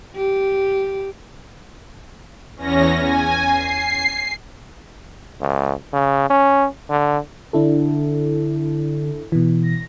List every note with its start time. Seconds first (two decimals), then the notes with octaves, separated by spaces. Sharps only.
0.16 G4
2.56 E2 C#4 A#6
3.00 G#5
3.47 C7
5.40 C#2
5.93 C#3
6.30 C#4
6.90 D3
7.53 D3 D4 E4 A4
9.32 B2 E3
9.63 A#6